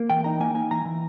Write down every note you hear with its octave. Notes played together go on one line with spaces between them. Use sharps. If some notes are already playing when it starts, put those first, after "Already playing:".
Already playing: A#3
E3 G5
D#4 A#5
A#3 G#5
D#4 G#5
E3 A#5
E3